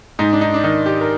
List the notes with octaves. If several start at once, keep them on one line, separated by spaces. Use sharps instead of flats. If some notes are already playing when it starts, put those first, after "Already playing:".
G#2 D#4
D4
D#4
D4
D#3 D#4
G4
A#4